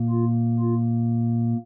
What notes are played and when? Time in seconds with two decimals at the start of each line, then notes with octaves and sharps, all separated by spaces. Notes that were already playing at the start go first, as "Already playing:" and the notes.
Already playing: A#2 A#3
0.10 F4
0.60 F4